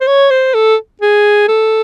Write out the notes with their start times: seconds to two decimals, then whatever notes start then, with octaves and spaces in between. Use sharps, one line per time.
0.01 C5
0.07 C#5
0.30 C5
0.54 A4
1.02 G#4
1.48 A4